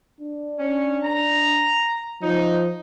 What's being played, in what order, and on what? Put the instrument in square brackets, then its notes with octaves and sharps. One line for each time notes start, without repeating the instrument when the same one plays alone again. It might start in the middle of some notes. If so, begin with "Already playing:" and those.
[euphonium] D4
[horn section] C#4
A#5
[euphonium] F3 [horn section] D#4